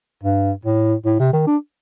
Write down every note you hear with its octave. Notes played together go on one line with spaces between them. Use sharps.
G2
A2
A2
C3
D#3
D4